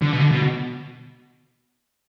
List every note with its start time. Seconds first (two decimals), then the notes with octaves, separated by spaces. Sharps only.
0.02 D3
0.13 B2
0.21 D3
0.32 B2